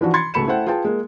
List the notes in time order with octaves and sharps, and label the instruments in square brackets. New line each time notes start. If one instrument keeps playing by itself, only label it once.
[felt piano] E3 F3 D4 F#4
B5 C6 G#6 A6 C#7
C#2 A3 F#4 B5 C#7 E7
A3 E4 C5 F#5 G5
F4 G#4 B4 G5 A5
G#3 A#3